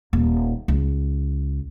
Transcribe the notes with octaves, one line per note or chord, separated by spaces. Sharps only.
D#1
C#2